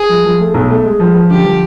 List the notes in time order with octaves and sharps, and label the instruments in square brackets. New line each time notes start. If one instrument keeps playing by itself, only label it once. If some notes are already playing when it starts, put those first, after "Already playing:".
Already playing: [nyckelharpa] G#4
[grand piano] F3
F3
A3
B1
A3
G#3
F3
F3
[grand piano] D3 [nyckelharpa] G4
[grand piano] F3